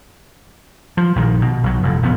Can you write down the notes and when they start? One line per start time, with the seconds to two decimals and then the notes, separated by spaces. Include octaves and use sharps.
0.97 F3
1.16 A#1 D#3
1.42 B2
1.63 B1 F#3
1.83 F1 A2
2.02 E1 A#1 F3 B3